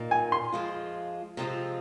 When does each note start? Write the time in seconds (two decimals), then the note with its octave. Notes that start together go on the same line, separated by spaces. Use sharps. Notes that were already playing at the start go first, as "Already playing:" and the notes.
Already playing: A#2 A#3 D#4
0.11 G#5
0.32 C6
0.52 F2 F3 G#3 F4
1.37 C3 F3 G#3 C4 F4